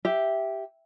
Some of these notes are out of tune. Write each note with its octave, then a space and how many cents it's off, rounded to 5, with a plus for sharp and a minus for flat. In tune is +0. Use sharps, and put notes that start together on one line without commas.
G4 +0 E5 +0